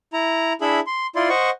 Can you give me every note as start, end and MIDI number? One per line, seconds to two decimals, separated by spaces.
0.13 0.53 64
0.13 0.53 82
0.61 0.80 62
0.61 0.80 64
0.61 0.80 68
0.61 0.80 76
0.61 0.80 83
0.87 1.07 84
1.16 1.29 64
1.16 1.29 65
1.16 1.29 74
1.16 1.29 84
1.29 1.50 72
1.29 1.50 75
1.29 1.50 78
1.29 1.50 85